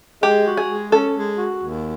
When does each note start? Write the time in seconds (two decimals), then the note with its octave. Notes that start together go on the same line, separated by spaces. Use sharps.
0.22 G#3 G4
0.46 F#4
0.57 G#4
0.70 G#3
0.92 C#4 A4
1.16 G#3
1.38 F#4
1.62 D#2